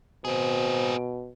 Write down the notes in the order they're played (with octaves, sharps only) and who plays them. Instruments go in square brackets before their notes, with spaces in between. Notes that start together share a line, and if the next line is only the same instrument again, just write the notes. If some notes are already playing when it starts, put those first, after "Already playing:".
[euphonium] B2 [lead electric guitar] C4 G#4 [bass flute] C5